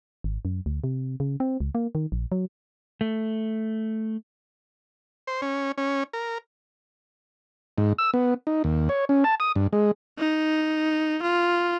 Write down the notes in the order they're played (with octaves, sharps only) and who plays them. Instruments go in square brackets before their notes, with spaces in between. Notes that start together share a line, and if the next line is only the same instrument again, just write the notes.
[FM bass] G#1
F#2
D2
C3
C#3
C4
C#2
A#3
D#3
A#1
F#3
[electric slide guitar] A3
[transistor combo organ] C5
C#4
C#4
A#4
G#2
E6
B3
D#4
D#2
C#5
C#4
A5
D#6
G2
G#3
[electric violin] D#4
F4